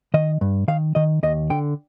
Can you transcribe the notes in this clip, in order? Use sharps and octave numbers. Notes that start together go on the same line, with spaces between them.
D#3 D#5
G2
D#3 F5
D#3 D#5
D#2 D#5
D3 G5